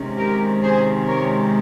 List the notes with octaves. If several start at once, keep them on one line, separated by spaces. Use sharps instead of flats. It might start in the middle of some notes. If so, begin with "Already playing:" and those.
Already playing: C3 D#3 G#3 C#4
G4 A#4
G#4 C5
A#4 C#5